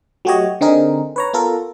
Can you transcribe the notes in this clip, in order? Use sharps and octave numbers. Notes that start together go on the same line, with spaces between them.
F#3 A3 F#4 G4 C#5 D#5
D3 C4 D#4 G#4 A#4
B4 C#5 A#5
B3 F4 A4 A#4